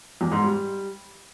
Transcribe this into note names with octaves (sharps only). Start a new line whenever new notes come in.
E2
G#2
G3